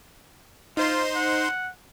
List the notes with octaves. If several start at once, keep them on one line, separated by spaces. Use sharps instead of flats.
D#4 F4 C5 C6
F#5